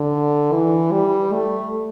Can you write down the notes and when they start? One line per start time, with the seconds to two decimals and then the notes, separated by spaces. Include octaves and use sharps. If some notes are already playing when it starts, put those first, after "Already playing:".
Already playing: D3
0.52 E3
0.92 G3
1.33 A3